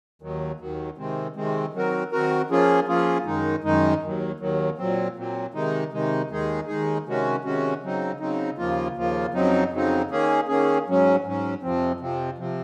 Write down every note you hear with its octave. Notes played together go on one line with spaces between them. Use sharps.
D#2 D#3 F#3
D#2 D#3 F#3
C3 D#3 G#3 C4
C3 D#3 G#3 C4
D#3 F#3 C4 F#4 A#4
D#3 F#3 C4 F#4 A#4
F3 A#3 C#4 F4 G#4
F3 A#3 C#4 F4 G#4
F#2 D#3 G#3 D#4
F#2 D#3 G#3 D#4
D#2 D#3 F#3
D#2 D#3 F#3
A#2 F#3 C4
A#2 F#3 C4
C3 D#3 G#3 D#4
C3 D#3 G#3 D#4
D#2 D#3 G#3 D#4 G#4
D#2 D#3 G#3 D#4 G#4
C3 D#3 G#3 C#4 F#4
C3 D#3 G#3 C#4 F#4
C#3 F#3 C4 D#4
C#3 F#3 C4 D#4
D#2 C#3 F3 A#3 F4
D#2 C#3 F3 A#3 F4
F2 C#3 F#3 C4 D#4
F2 C#3 F#3 C4 D#4
D#3 A#3 C#4 G#4
D#3 A#3 C#4 G#4
G#2 F#3 C#4
G#2 F#3 C#4
F2 C3 F3 C4
F2 C3 F3 C4
C3 F3 C4